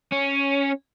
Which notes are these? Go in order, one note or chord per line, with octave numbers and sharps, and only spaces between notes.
C#4